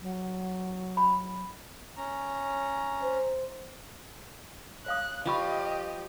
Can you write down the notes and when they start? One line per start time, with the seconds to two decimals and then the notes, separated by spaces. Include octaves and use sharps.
0.02 F#3
0.97 B5
1.97 C#4 A#5
3.03 C5
4.86 C#5 F5 D#6 F#6
5.26 F3 F4 G4 D#5 F5 B5 C#6